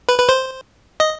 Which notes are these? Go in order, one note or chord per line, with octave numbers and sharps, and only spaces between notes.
B4
B4
C5
D#5